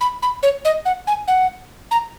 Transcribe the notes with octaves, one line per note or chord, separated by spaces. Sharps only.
B5
B5
C#5
D#5
F#5
G#5
F#5
A#5